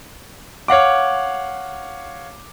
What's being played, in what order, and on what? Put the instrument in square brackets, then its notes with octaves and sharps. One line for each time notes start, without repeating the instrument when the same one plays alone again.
[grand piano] C#5 F5 F#5 D6